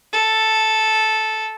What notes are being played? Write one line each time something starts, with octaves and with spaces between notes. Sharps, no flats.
A4